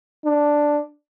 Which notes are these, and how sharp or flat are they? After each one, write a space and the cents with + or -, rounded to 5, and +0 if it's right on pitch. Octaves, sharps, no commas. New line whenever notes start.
D4 +0